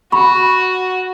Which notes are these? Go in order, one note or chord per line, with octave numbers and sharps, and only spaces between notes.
F#4 B5 C#6